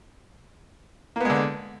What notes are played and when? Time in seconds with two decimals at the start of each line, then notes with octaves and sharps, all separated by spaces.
1.16 A#3
1.20 B3
1.25 G#3
1.30 D3